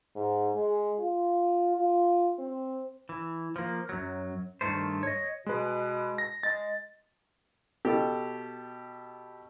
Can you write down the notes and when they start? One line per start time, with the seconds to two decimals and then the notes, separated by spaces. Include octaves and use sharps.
0.16 G#2
0.56 G#3
0.99 F4
1.76 F4
2.39 C4
3.09 E3
3.56 F3 A#3
3.89 F#2 F#3
4.61 G2 A#2 D#3 A3 C5
5.03 C#5 D#5
5.46 B2 G#3 B4
6.18 A#6
6.43 G#3 A6
7.85 B2 G4 A4